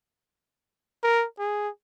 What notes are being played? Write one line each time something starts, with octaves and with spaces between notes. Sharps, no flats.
A#4
G#4